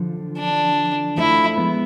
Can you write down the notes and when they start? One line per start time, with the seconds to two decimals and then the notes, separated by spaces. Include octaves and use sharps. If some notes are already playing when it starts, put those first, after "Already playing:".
Already playing: D3 F3
0.37 D4
1.17 F3 A3 E4
1.57 G#3 B3